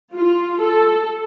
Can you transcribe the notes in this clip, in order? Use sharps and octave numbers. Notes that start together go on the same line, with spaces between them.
F4
A4